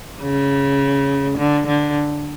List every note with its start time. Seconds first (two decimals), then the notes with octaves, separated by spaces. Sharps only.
0.22 C#3
1.38 D3
1.67 D3